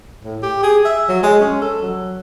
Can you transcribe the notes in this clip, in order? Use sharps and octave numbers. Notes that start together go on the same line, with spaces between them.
A2
G4
G#4
E5
F#3
G#3
C#4
A4
F#3